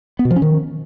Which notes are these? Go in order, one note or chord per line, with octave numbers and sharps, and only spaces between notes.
B3
B2
F3
C#4
D#3